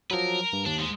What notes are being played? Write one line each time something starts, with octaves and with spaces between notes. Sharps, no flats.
F3 F#3 A#4 B4
G2
D#2 D4
G#2 G#3